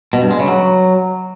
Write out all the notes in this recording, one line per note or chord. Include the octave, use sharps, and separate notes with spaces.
B2
G2
G#3
C#3
F#3